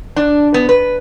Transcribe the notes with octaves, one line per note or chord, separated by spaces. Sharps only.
D4
B3
B4